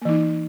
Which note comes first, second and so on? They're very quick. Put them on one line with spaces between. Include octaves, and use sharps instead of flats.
A#3 E3 D#4